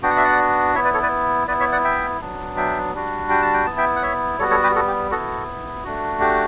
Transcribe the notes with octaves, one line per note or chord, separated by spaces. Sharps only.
B3 D4 F#4 G5
F#5
E5
D5 F#5
B3 E4 C#5 E5
B4 D5
A4 C#5
B4 D5
B3 E4 B4 D5
C#5 E5
D5 F#5
E5 G5
F#3 B3 D4
E5 G5
G3 D4 F#4
G5
A5
G5
B3 E4 A5
E5 G5
F#5
C#5 E5
G3 B3 F#4 A4 C#5
A4 C#5
G4 B4
F#4 A4
G4
B3 E4 F#4 A4
A3 D4 F#4
G4